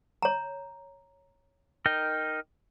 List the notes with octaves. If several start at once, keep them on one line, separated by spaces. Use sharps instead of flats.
C#5 A#5
D#4 A#4 G5